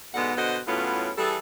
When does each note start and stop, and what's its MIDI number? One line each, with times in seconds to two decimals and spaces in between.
0.14 0.32 44
0.14 0.32 47
0.14 0.32 50
0.14 0.32 56
0.14 0.32 59
0.14 0.32 78
0.36 0.57 47
0.36 0.57 50
0.36 0.57 72
0.36 0.57 75
0.36 0.57 78
0.66 1.10 40
0.66 1.10 45
0.66 1.10 54
0.66 1.10 59
0.66 1.10 61
0.66 1.10 65
1.18 1.37 52
1.18 1.37 55
1.18 1.37 68
1.18 1.37 69